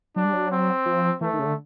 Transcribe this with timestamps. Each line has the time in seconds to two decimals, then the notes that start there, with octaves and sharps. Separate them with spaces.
0.16 F#3 D4
0.25 G3
0.33 F#3
0.52 C4
0.86 F3
1.21 E3 A3
1.34 D#3
1.39 C#3
1.45 D3